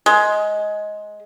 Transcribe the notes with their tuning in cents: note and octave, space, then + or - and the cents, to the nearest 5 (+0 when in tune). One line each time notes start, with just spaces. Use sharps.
G#3 +15